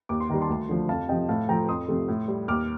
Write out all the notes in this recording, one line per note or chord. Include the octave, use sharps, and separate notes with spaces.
D#2 D6
C6
D#3 G3 A#5
A5 C6
D2
D3 F3 A3
F2 F5 A5
C3 F3 D#5 G5
A2 F5 A5
F3 A3 G5 A#5
F2 C6 D#6
C3 F3 A3
A2
G3
D#2 D6 F6